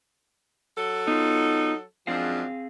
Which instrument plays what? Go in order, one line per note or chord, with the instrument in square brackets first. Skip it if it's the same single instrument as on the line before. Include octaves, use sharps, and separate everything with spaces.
[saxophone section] F#3 A4
[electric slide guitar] B3 F4 [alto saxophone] D#4
[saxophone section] F#2 G#3 D4 [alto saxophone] F3 [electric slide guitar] C4 G#4 F5